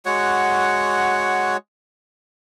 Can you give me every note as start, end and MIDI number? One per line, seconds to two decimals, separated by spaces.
0.06 1.57 56
0.06 1.57 66
0.06 1.57 73
0.06 1.57 78